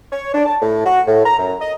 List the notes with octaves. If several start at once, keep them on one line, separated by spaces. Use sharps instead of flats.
C#5
D4
A5
A2
F#4
A2
A#5
F#2
D#5